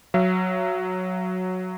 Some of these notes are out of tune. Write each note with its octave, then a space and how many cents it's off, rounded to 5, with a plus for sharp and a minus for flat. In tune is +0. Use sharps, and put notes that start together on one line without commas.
F#3 -5 E5 +45